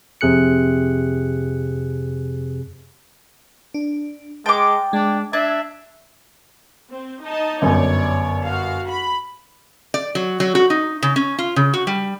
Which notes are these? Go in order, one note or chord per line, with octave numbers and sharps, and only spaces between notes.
F2 C3 G#4 F#6 C#7
D4
G#3 G5 A5 D6
G#3 D4
D4 E5 G#6
C4
D#4 D#5 A5
G1 F#2 C#5 D5
F#4 F5
B5
D5
F#3
F#3
F#4
D#4
C#3
C#4
F4
C#3
F#4
G3